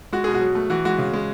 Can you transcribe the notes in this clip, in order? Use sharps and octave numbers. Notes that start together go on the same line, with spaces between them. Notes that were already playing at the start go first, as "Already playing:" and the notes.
G#3 F#4
B2 G#4
F#4
F#3
A3
E3 F#4
G#3 F#4
C#3
G#3